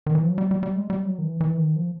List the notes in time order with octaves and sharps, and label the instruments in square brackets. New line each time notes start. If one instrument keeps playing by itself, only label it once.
[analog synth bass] D#3
E3
F3
F#3
G3
G3
G3
G#3
G3
F#3
D#3
E3
E3
D#3
F3